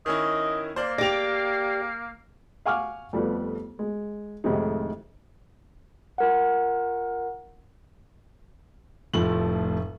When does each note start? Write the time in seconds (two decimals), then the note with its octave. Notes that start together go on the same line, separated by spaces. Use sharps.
0.06 D#3 C#4 E4 D#5
0.76 A#3 C5 D5
0.98 G4 D5 A#6 F7
2.66 F5 F#5 G#5 C#6 D6 F6
3.13 F2 F3 G3 A3 B3
3.79 G#3
4.44 F2 A2 C3 D#3 G#3 D#4
6.18 F4 A#4 F#5
9.14 F1 A2 F3 A3 F#7